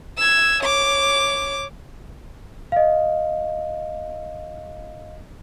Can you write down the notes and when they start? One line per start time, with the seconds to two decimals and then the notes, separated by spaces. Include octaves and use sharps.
0.18 E6 G#6
0.63 C#5 D6
2.72 D#5 F5